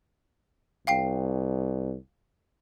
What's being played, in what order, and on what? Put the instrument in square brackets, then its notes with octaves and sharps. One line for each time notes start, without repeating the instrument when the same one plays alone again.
[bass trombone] C2 [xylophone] F5 G5 C7